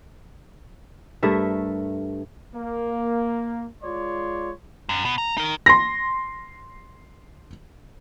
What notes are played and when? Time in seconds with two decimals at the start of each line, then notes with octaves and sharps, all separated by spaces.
1.23 G2 A3 A#4 E5
2.55 A#3
3.83 G#3 F4 C#5 D5 C6
4.89 F#2
5.05 B2
5.18 A#5
5.38 D#4 A#4
5.66 C6 A#6